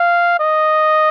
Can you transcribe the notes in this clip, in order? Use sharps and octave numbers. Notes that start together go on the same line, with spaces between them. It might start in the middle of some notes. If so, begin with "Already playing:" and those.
Already playing: F5
D#5